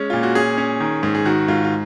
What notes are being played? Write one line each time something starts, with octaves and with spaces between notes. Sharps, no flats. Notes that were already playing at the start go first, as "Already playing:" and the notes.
Already playing: G#3 C#4
A#2 F4
F#4
C#4 G#4
C#4
D#3
G#2
G#4
D#3 F#4
G#2 F4
F4